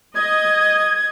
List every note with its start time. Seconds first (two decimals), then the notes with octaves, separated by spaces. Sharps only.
0.15 D#5 G#6